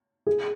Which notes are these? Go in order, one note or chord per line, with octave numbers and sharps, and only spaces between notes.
G#4